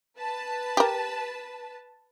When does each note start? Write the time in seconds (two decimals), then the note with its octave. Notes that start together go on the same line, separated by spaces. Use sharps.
0.19 B4 A5
0.77 G4 A#4